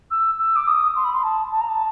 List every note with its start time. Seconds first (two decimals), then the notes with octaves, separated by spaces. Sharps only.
0.11 E6
0.39 E6
0.56 D6
0.68 D#6
0.96 C6
1.05 B5
1.14 C6
1.23 A5
1.52 A5
1.61 A#5
1.69 A5